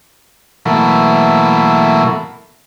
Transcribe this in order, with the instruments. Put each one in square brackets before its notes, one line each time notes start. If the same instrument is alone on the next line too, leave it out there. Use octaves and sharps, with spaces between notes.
[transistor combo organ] B2 E3 F#3 A3 A#3